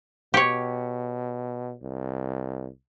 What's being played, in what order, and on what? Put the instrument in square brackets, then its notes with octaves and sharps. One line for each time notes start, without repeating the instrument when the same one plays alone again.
[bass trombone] B2 [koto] G4 C#5
[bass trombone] C2